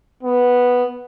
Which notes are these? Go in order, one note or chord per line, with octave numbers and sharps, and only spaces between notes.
B3